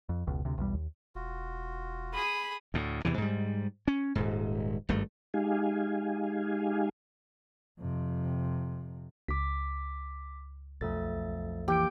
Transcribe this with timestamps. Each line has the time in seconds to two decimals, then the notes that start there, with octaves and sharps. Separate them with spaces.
0.09 F2
0.27 F1 C#2 B2
0.45 D2 C3
0.58 B1 E2 G3
0.74 D#2
1.15 E1 F4 F#4
2.14 G#4 B5 D#6
2.74 D2 A2
3.05 E2 C3 E3
3.18 G#2 G3
3.88 C#4
4.15 D#1 G#2
4.89 G#1 G2 A3
5.34 G#3 D#4 G4 F5 G#5
7.79 F2 C3
9.28 C#2 D6 B6
10.81 B1 F2 A3 A4 A6
11.68 E3 A#3 G4 G6 D7